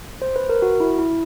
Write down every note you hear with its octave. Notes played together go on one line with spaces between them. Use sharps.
C5
B4
A#4
F#4
E4
E4